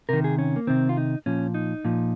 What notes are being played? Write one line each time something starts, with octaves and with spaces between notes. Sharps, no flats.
C3 D#3 A#4
G#4
C#4
A#3
C3 D#3 C4
F4
D#4
A#2 F3 C#4
D#4
A#2 F3